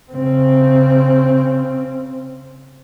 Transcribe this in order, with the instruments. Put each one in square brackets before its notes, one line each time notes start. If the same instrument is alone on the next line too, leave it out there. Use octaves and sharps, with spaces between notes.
[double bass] C#3 C4